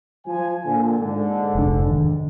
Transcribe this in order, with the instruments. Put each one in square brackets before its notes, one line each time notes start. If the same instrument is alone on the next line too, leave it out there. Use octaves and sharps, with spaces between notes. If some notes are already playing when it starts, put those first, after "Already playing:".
[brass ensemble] F3 G#5
A#2 D3
G#2 D3
[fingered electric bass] F1 D4
D#3